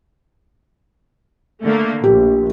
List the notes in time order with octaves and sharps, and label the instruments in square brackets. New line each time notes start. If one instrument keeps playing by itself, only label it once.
[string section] D3 A3 A#3
[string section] A#1 [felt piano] G4